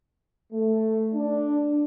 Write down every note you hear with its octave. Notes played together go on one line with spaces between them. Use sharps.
A3
D4